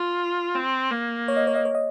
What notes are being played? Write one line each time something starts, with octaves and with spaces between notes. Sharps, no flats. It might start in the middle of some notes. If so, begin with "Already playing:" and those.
Already playing: F4
C4
A#3
C#5
D#5
C#5
D#5
C#5
D#5